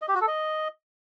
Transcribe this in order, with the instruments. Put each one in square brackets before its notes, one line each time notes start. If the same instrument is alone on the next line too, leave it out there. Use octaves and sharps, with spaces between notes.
[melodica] D#5
G4
F#4
A4
D#5